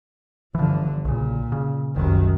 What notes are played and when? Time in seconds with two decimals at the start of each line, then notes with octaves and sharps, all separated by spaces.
0.55 G1 D3 E3 F3
1.05 B1 A#2 C#3
1.52 C#3
1.96 F#1 C2 F#2 D#3